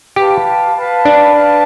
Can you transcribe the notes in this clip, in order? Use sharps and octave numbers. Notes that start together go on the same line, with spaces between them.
G4 B4 F5 A5
B4 F5 A5
D4
B4 F5 A5